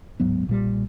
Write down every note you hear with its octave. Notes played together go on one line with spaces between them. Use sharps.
D1 G#2 F#3 B3
B1 A#2 G3